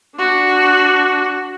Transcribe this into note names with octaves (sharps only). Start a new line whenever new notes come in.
D4 F#4